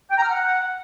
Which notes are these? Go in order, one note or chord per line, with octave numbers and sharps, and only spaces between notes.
G5
A#5
F6
F#5